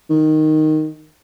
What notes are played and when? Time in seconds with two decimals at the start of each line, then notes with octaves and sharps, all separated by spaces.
0.10 D#3